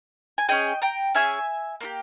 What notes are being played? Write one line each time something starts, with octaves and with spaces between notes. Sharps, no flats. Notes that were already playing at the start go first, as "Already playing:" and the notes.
G#5
C#4 G#4 D#5 G5
G5 A#5
C#4 G#4 E5 G#5
A#3 E4 G4